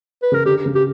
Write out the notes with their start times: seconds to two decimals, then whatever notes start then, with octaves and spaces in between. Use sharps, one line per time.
0.23 B4
0.32 C#3 A#4
0.45 D3 G4
0.66 C#3
0.75 G4